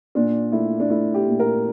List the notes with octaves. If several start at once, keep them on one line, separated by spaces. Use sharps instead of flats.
A#2 D4
A3 E4
D4
A3 E4
G4
A#2
A#4